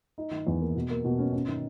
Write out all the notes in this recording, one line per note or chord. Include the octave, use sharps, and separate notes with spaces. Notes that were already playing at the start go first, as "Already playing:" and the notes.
D#4
D#3
E2
A#3
B2
A#3
B2
C#4
C#4
D#3